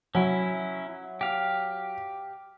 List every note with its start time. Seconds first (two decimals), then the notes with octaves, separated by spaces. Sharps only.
0.15 F#3 C#4 E4
1.21 G4 F5